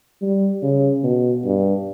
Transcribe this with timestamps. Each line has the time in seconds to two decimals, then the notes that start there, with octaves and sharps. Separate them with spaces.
0.22 G3
0.63 C#3
1.04 B2
1.45 G2